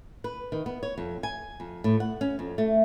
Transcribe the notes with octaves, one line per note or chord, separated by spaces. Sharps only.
B4
D#3
B3
C#5
F2
G#5
F2
A2
F#5
C#4
F2
A3